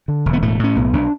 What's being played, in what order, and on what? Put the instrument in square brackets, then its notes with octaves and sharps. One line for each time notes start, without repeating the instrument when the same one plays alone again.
[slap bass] D3
E1
B3
A2 A3
A2 C#4
B1 B3
B1 D4